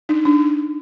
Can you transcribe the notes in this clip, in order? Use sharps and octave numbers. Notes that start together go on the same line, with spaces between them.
D4 D#4
D4